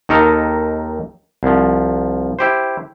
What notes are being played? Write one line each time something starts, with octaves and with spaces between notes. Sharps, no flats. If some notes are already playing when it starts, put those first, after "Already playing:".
D#2 D#4 A4 A#4 D#5
C2 F3
E4 G4 C5